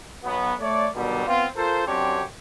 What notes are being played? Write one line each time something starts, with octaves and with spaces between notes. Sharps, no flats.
B1 F#3 B3
A3 C#5 D5
B2 D3 D#3 F#3 G3
B3 C4 F4
F4 A4 A#4 C5
F#2 C4 D4 G4 C#5